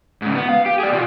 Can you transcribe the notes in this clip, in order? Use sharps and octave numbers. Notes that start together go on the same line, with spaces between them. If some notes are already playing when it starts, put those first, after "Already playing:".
G#2 C#3
B3
F5
G4
G#4 D5
B2 F4